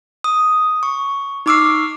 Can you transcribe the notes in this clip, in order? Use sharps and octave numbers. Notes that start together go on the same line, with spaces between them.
D#6
C#6
D#4 C#6 D6 E6 F6 C7